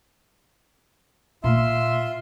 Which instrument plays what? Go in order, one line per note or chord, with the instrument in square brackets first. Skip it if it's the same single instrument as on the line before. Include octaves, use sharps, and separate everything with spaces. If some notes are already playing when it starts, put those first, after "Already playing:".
[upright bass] A#2 A#3 [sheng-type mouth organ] F4 C6 [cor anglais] E5